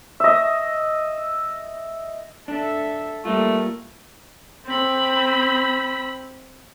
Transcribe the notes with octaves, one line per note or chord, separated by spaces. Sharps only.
D#5 E5
D4 A4 E5
G3 A3 A#3 F4
C4 B5